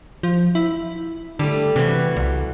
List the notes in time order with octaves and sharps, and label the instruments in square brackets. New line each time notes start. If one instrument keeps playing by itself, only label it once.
[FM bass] F3
E4
[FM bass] D3 [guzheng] G3 A3
[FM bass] C3 [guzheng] E3 F#4
[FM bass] C2